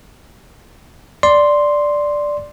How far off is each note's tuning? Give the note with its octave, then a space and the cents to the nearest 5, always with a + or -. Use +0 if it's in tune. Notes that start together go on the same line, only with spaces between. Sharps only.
D5 +0 C6 +0